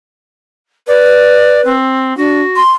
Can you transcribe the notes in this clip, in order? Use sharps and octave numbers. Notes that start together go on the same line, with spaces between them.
B4 D5
C4
D4 F#4
C6